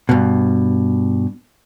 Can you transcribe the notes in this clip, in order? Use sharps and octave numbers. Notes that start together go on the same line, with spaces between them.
G2 B2